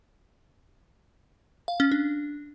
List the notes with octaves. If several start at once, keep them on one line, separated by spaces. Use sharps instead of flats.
F5
C#4
D4